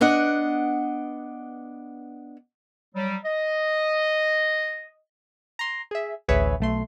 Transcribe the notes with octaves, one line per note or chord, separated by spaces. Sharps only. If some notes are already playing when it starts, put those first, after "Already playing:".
B3 D4 D#5 F#5
F#3 G3
D#5
A#5 C6
G#4 E5
A1 D2 G#4 B4 C#5 E5
B1 A3 C6